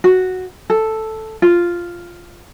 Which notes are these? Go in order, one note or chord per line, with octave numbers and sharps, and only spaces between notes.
F#4
A4
F4